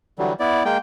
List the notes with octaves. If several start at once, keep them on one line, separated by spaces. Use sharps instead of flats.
D3 E3 F#3 G3
B3 E4 D5
G#3 A#3 G5